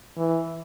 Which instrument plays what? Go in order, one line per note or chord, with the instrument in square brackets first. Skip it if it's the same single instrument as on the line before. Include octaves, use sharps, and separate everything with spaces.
[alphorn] E3